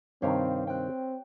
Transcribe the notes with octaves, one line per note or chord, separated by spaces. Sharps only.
G2 C3 D#3 C4 G4 C#5 F5
C4 G5 F#6